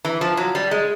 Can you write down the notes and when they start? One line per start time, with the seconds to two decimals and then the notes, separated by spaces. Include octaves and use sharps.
0.05 E3
0.21 F3
0.37 F#3
0.55 G3
0.71 G#3